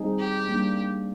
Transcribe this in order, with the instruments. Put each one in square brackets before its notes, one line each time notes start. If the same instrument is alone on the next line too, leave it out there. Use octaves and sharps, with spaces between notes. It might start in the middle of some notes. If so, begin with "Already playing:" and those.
Already playing: [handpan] G3 C4 D#4 G#4
[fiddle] G4
[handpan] G3 A#3 D4